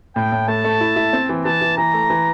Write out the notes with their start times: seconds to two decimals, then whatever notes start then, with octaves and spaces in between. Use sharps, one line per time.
0.16 A2 G5
0.32 A2
0.48 A3 A5
0.64 A3
0.81 E4
0.96 E4
1.13 C4
1.29 E3
1.45 E3 A5
1.61 E3
1.78 E3 A#5
1.94 A3
2.10 E3